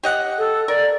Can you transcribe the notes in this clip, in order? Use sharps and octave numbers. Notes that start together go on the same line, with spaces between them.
G4 D#5 F#5
A4
A#4 D5